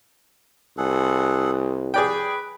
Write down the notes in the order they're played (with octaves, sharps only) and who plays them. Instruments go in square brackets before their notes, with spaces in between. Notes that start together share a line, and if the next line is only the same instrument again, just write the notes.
[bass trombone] C2 [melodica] G#4 A4 F#5
[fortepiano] G#4 D5 G5 [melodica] B4